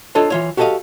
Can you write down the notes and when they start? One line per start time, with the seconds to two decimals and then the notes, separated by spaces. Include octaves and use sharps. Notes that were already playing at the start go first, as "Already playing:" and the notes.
0.15 D4 F4 A4 C#5 D#5
0.30 E3 F4 C#5
0.57 F#4 G4 A4 C#5 D#5 F5